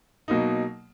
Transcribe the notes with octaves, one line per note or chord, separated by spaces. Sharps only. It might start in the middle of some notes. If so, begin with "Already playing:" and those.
B2 F#3 A#3 D#4